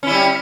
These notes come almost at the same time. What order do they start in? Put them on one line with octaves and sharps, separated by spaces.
C#4 E4 G3